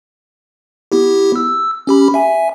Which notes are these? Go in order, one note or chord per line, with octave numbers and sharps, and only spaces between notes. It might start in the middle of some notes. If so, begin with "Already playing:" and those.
B3 E4 G4
E6
C#4 G4 B5
E5 G#5